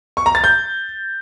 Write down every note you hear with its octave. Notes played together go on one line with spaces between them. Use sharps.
C#6
A#5
A6
G6